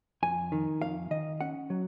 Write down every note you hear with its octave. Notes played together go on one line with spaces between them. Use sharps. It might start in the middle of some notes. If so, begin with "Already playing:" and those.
F2 G#5
D#3
F2 F5
D#3 D#5
C#4 F#5
F#3